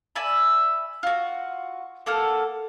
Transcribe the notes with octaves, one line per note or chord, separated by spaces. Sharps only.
D5 E5 G#5 B5
F4 F#4
A#3 A4 F#5 F6